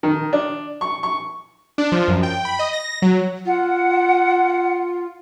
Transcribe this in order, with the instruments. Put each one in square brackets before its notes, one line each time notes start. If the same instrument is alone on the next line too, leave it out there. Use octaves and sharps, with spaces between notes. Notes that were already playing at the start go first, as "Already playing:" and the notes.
[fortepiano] D#3
D4
C#6
C#6
[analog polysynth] D4
F3
F#2
G5
B5
D#5
A#6
F#3
[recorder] F4 [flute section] F#5